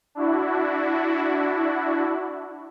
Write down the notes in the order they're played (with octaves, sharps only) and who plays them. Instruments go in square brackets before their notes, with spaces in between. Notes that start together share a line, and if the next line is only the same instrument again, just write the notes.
[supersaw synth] D4 E4 F#4